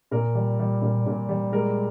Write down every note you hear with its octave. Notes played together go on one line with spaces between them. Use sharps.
A#2 A#4
G3
G3
A#2
A#2
G3
G#3 A#4